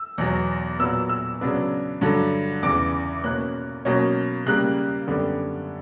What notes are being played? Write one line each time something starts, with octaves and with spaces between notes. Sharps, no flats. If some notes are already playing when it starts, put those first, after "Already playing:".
Already playing: E6
E2 B2 F#3
A#2 F#3 B3 E6
E6
C#3 F#3 B3 D4
G2 D3 F#3
E2 C#3 E3 D6
B2 A#3 C#4 F#6
B2 F#3 A#3 C#4
C#3 G3 A#3 F#6
F#2 D3 G3 B3 D4